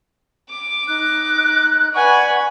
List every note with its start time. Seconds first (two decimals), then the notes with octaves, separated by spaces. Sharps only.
0.50 D6
0.87 D#4 F#6
1.94 B4 D5 F#5 G#5 C#6